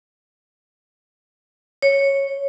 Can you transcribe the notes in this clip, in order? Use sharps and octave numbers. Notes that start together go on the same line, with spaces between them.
C#5